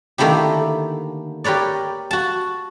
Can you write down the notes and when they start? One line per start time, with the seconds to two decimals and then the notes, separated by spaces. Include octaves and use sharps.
0.18 D3 D#3 A3 A#3 E4 G4
1.44 G4 A#4 B4 C#5 D5
2.11 F#4 A5